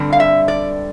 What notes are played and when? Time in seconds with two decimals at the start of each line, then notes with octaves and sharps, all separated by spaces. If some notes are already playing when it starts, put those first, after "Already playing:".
Already playing: G2 D3 G3 C4
0.13 F5
0.20 E5
0.48 D5